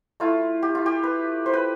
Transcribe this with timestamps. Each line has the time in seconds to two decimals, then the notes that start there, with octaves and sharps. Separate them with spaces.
0.20 A3 E4 F4
0.63 G4
0.75 F4
0.86 G4
1.03 B4
1.46 C5
1.54 B4